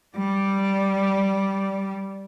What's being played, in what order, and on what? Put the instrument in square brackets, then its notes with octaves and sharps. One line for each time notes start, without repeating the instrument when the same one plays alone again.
[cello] G3 D5